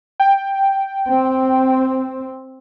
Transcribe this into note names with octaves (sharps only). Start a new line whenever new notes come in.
G5
C4